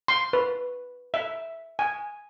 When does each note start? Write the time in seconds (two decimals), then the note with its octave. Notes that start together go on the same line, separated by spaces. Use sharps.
0.08 C6
0.33 B4
1.14 E5
1.79 G#5